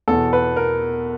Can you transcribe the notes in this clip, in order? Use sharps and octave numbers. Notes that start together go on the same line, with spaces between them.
E2 B2 A4
B4
A#4